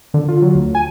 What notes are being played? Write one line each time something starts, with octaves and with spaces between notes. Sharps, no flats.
D3
F4
F#3
D2
G#5